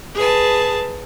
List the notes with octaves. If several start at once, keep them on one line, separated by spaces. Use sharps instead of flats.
G#4 B4 A5